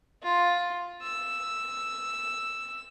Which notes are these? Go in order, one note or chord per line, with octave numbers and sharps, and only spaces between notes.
F4
E6